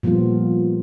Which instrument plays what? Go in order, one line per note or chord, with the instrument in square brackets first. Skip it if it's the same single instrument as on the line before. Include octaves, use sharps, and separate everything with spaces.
[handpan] A#2 F3 G3 B3 F4